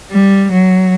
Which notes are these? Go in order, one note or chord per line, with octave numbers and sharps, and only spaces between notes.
G3
F#3